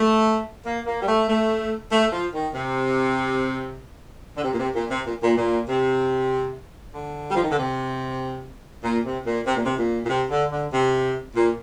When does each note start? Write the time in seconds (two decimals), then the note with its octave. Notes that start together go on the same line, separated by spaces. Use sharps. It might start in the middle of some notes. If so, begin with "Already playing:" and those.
Already playing: A3
0.64 A#3
0.85 A#3
1.01 G3
1.07 A3
1.28 A3
1.90 A3
2.12 F3
2.33 D#3
2.53 C3
4.36 D3
4.42 C3
4.52 A#2
4.58 C3
4.74 A#2
4.89 C3
5.05 A#2
5.21 A#2
5.36 A#2
5.68 C3
6.93 D3
7.29 G3
7.35 F3
7.42 D#3
7.50 D3
7.57 C3
8.83 A#2
9.04 C3
9.24 A#2
9.45 C3
9.55 A#2
9.65 C3
9.77 A#2
10.04 A#2
10.08 C3
10.29 D3
10.50 D3
10.71 C3
11.34 A#2